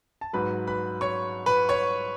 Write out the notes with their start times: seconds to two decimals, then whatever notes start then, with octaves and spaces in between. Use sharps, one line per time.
0.21 A5
0.33 G#2 F#3 B4 B5
0.67 B4 B5
1.01 C#5 C#6
1.46 B4 B5
1.69 C#5 C#6